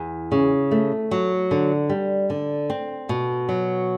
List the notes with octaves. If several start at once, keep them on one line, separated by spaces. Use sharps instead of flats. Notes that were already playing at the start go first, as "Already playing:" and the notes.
Already playing: E2
C#3
A3
F#3
D3
G3
D3
C4
B2
F#3